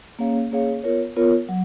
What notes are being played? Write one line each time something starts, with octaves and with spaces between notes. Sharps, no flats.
A#3 C#4 G#4 C#5 F5
A#3 C#4 G#4 C#5 F5
B3 F4 A#4 C#5
B3 F4 A#4 C#5
F#3